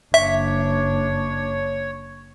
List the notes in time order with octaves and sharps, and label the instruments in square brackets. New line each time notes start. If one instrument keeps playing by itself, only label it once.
[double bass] F#1 D4 [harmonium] C#5 [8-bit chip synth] E5